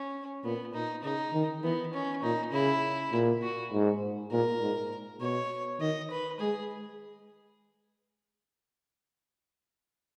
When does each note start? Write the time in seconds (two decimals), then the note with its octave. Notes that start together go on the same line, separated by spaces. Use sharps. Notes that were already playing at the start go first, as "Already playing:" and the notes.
Already playing: C#4
0.44 A#2 B3
0.74 A#2 D#4
1.03 C#3 D#4
1.34 D#3
1.63 E3 B3
1.93 C#4
2.23 A#2 D#4
2.52 C#3 E4
3.13 A#2
3.42 F#4
3.72 G#2
4.31 A#2 A#4
4.61 G#2
5.21 B2 C#5
5.80 D#3 D#5
6.10 B4
6.40 G#3 G#4